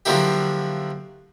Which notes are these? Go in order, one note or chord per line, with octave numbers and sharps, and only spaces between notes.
D3 F3 F#3 A#3 E4 G4